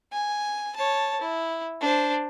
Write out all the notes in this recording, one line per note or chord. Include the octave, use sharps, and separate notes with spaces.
G#5
C#5 A5
E4
D4 C5